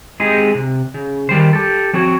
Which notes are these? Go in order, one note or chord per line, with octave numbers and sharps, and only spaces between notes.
G#3 C4 D#4 G4 G#4
C3
C#3
D#3 G3 C5
G4 A4
F3 C4 F#4 C#5